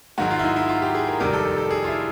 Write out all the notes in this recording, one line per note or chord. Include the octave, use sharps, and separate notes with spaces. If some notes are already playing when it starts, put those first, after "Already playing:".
G#2 D#3 F#3 F#4
F4
E4
D#4
E4
F4
G4
G#4
A#4
F2 C3 D#3 G3 A#4
A4
A4
A4
G#4
F4
E4